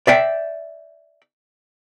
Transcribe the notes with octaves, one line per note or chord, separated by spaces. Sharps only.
D5 E5 G5